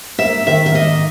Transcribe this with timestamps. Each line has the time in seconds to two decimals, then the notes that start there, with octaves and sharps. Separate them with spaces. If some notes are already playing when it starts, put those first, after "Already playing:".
0.18 A#3 E5
0.46 D#3 E5
0.66 E5
0.74 A#3 D#5